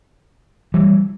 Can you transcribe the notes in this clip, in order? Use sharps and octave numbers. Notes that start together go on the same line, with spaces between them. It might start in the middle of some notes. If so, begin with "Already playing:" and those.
E3 G3